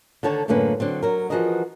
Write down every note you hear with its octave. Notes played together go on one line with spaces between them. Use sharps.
D3 D#3 A4 C#5 A5
F#2 A2 D3 A#3 C#4 B4
D3 F#3 C4
F#3 A#4
E3 F3 F#4 G#4 A#4 D#5